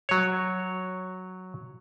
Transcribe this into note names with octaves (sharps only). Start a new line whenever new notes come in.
F#3 C#5